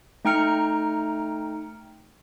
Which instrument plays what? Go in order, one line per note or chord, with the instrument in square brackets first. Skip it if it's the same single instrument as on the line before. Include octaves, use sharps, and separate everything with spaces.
[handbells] A3 D#4 G5 A#5 F6 C#7